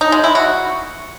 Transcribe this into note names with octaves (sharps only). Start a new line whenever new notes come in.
D#4
G#3
E4
F#4